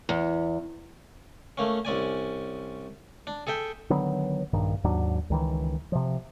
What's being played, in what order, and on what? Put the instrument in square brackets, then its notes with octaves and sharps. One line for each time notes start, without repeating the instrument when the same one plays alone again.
[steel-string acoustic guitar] E2
[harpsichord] A3 A#3 C#4
C2 C#4 D5 G#5
D4
G#4 A4 E5 G5
[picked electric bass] D3 D#3 F#3 B3
A#1 G2 D#3
D#2 G#2 F#3 D4
C#2 D#3 E3
C3 F3